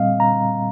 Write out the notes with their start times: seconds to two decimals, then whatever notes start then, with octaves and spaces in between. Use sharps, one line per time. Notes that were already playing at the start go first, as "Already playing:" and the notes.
Already playing: A#2 G3 C4 D#5 F5
0.20 A#5